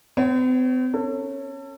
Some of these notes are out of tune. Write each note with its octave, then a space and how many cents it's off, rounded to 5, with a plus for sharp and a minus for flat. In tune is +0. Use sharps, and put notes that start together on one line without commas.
C4 -45 C#5 +0
C#4 -10 A4 +30